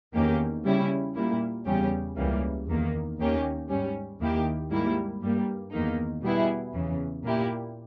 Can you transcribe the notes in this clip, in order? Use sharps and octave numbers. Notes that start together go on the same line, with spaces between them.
E2 D#3 A#3 C#4 G4
C#3 G3 C#4 E4
A#2 G3 A#3 E4
E2 C#3 G3 C#4 G4
C#2 C#3 E3 G3 A#3
E2 D#3 A#3
D#2 D#3 A#3 C#4 G4
G#2 G3 C#4
D#2 D#3 A#3 E4 G4
G#2 G3 A#3 E4
G2 G3 A#3
E2 D#3 A#3 D#4
B2 G3 B3 E4 G#4
E2 C#3 E3
A#2 A#3 E4 G4